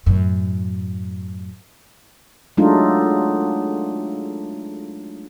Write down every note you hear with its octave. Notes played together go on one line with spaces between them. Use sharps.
F#2 A2
F#3 G#3 A3 D4 D#4 F4